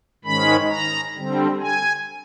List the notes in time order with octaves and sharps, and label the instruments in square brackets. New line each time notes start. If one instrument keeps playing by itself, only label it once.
[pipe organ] G#2 D#3 G#3 C#4 B5
A#5
D3 G3 C4
G#5